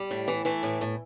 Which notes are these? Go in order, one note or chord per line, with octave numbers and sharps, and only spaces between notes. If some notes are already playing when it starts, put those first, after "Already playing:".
Already playing: G3
A2
E3
E3 A3
A2
A2